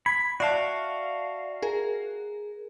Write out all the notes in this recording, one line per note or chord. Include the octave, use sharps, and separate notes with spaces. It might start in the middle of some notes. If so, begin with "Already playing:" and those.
B5 G#6
F#4 D5 E5 F5 A5
G#4 A#4